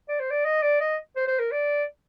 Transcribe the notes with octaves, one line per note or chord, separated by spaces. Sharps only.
D5
C5
D5
D#5
D5
D#5
C5
C5
A#4
D5